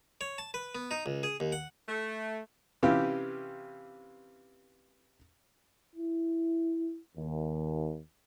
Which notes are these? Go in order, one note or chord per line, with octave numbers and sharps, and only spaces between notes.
C#5
A5
B4
B3
D#4
C#2
G#4
D#2
F#5
A3
C3 E3 C#4 F4 G4
E4
D#2